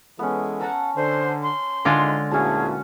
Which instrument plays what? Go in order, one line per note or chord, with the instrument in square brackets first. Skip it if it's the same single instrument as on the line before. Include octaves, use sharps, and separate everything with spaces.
[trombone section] E3 G#3 A4 [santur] B3 C#4
[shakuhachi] F#5 [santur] A5 A#5 E6
[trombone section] D3 [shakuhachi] C5
[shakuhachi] C6
[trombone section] G#1 D#4 [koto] D3 G#3 F4
[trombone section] D2 A#2 E4 [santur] C#4 F#4 A5 [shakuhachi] G#4